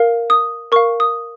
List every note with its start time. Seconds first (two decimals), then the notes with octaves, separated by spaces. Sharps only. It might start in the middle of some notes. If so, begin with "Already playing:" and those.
Already playing: A#4 F5
0.30 D#6
0.72 A#4 F5 C#6
1.00 D#6